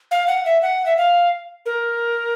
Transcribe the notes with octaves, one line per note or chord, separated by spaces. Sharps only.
F5
F#5
E5
F#5
E5
F5
A#4